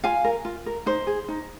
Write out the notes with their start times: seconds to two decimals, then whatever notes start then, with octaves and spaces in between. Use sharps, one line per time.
0.04 F4 F5 G#5
0.24 A#4
0.45 F4
0.66 A#4
0.86 D#4 C5
1.07 G#4
1.28 D#4